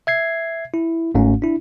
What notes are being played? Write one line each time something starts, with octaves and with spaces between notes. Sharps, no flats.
E5 G#6 C7
E4
G1 G#2 A3 C#4
D4 E4